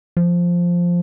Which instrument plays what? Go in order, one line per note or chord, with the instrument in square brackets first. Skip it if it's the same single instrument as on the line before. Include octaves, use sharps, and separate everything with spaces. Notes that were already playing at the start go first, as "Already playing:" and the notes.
[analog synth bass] F3